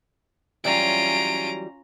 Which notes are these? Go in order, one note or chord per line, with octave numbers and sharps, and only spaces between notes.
E3 F#3 G3 C#4 F4 A#5 D7